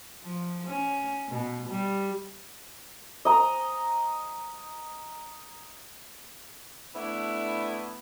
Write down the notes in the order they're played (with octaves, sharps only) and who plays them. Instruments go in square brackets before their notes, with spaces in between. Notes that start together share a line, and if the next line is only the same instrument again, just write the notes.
[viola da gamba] F3
C#4
B2
G3
[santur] D#5 A#5
[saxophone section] A3 B3 D4 E4